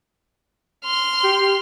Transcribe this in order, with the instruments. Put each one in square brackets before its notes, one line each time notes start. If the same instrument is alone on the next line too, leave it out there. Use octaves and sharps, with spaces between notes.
[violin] C6 F6
[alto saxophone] G4